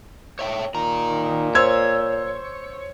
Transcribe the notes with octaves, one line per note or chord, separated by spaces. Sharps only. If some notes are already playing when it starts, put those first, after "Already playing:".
C#5 E5 G5
A#2 D#3 A#5
C5 C#5 E6 G#6